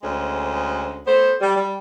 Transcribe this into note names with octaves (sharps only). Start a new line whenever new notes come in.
D2 G#3 C#4 G#4 C5
A3 B3 C5
G3
G3